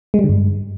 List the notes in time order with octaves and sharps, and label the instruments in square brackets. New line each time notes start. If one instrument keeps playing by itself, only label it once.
[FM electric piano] G#3
G3
D3
G2